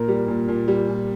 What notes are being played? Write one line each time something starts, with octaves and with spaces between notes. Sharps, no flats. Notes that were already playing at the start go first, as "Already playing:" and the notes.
Already playing: A#2 A#4
G3
A#2
A#2
G3
A#2